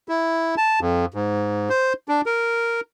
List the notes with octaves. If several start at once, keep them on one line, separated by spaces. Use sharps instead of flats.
E4
A5
F2
G#2
C5
D4
A#4